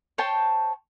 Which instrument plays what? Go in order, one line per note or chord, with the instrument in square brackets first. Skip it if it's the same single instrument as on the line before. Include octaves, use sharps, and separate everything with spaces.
[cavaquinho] C5 C#5 G5 A5